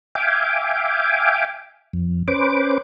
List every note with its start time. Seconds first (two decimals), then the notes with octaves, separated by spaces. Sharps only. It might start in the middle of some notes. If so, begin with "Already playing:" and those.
0.15 E5 F5 G5 G#5 D6
1.93 F2
2.28 C#4 B4 C5 D6